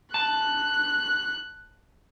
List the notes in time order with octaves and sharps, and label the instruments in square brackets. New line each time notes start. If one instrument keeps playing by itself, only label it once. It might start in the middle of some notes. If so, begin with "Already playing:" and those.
[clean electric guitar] A5 [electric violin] F#6